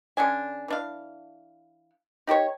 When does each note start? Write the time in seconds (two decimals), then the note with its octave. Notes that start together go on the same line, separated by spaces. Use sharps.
0.17 D3 C#4 D4 G#5
0.68 E3 D4 F5
2.27 D#4 G4 A#4 C#5